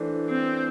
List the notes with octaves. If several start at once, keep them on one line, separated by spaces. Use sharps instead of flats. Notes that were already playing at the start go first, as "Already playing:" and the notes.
Already playing: E3 A3 D4 A4 C5
C4